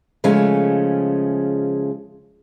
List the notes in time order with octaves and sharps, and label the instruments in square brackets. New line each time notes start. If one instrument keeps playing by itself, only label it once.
[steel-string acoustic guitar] C#3 F3 G#3 A3 C#4